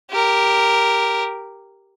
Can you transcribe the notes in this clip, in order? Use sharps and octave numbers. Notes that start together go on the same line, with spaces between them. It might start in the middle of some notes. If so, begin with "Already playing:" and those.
G4 A#4